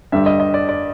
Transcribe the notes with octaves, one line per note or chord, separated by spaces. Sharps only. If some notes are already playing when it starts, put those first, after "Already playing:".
G2 D3 G3 E5
D#5
D#5
D5
D5